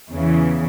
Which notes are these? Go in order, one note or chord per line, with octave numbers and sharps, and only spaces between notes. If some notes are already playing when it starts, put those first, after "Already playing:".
E2 C#3 E3